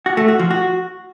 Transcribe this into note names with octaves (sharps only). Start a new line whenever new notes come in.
F#4
A3
F#4
F3
F#4